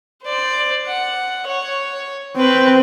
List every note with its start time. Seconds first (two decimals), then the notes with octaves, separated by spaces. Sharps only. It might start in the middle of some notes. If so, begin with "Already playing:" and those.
0.23 C5 D5
0.86 F#5
1.47 C#5
2.37 C4 B4 G5